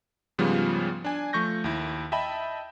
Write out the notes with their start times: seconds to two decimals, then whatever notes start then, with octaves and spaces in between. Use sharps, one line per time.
0.38 G#2 C#3 F3 G3 B3 F4
1.04 D4 G#5
1.33 F3 A3 C#6 G6 A#6
1.64 D#2 E4
2.12 D#5 E5 G5 A5 B5